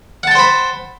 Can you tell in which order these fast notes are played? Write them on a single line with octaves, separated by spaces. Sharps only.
F#5 A5 G5 C5 B5